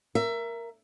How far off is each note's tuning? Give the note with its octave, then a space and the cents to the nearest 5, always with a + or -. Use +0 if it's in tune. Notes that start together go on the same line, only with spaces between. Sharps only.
A#4 +0 E5 +25